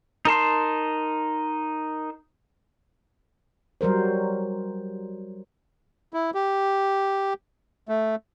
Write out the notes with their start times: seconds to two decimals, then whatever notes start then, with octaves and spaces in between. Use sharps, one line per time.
0.25 D#4 A#4 A5 C6
3.81 F#3 G3 A#4 C5
6.13 E4
6.34 G4
7.89 A3